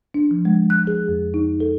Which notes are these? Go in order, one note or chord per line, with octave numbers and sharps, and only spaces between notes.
D4
F3
G#3
F#6
G#4
F2
D#4
A4